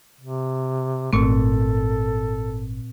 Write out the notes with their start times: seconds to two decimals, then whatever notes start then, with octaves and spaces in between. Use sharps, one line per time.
0.21 C3
1.13 G#1 A#2 A3 C4 A4